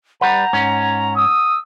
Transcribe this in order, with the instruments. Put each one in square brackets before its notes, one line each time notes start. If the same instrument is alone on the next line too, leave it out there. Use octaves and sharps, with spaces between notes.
[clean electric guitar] G3 B4 [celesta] F#5 [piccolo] A#5
[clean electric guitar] G#2 C#4
[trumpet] D#6 [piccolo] E6